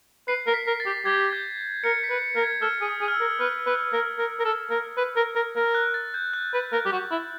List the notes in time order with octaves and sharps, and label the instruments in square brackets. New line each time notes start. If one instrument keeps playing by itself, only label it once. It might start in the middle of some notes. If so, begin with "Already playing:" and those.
[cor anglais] B4 [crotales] C7
[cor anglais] A#4
[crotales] B6
[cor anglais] A#4
[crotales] A6
[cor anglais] G4
[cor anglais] G4 [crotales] G#6
[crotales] G6
[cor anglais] A#4 [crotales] C#7
[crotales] B6
[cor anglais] B4
A#4
[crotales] G#6
[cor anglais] A4 [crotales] F6
[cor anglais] G#4
[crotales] D#6
[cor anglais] G#4
[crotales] F6
E6
[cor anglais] A#4
[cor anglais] B4 [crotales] F6
[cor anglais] B4
A#4
A#4
A#4
A4
A#4
B4
A#4
A#4
A#4
[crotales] F#6
A6
G6
F#6
[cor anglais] B4
A#4
G4
F#4
E4